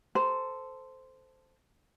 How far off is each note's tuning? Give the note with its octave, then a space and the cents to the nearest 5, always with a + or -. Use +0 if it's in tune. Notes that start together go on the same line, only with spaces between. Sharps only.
A4 +0 C5 -10 A#5 -15